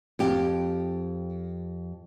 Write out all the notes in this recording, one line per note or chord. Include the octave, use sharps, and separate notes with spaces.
F2 G4